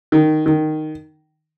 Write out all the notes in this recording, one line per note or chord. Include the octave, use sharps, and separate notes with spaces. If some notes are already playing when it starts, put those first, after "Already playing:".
D#3
D#3